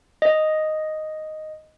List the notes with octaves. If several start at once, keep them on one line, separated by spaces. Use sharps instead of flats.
D#5